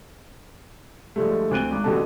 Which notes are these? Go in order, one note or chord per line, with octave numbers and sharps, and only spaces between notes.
G2 D3 F3 G#3 A3
D2 C4 F#6 D7 D#7 G7
G#1 D6
A1 G2 B2 D3 A4 A5